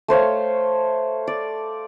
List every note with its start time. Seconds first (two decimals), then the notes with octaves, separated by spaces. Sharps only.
0.08 A3 C5 C#5 F5
1.27 D5